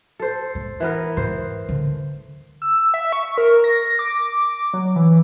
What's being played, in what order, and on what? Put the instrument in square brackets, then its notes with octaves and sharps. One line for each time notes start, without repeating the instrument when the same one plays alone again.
[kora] A4 C5
[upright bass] A3
[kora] E3 B3 A#4
[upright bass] G#2 [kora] C5
[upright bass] D3
[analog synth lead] E6
E5
C#6
A#4
A#6
D6
F#3
E3